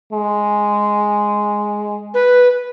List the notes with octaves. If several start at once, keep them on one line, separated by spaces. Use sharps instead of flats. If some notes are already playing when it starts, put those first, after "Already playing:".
G#3
B4